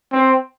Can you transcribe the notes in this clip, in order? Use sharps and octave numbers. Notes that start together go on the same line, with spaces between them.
C4